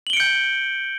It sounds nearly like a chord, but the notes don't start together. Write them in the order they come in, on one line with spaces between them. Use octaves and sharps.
F#7 G7 D7 C#7 G6